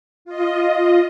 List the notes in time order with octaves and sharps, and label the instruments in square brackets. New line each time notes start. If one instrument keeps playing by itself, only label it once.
[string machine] F4 D#5